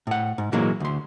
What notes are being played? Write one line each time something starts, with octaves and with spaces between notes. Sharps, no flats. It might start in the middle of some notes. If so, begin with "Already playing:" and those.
A2 F#5
G#2
A#2 E3 F#3 G#3 A#3
D2 C6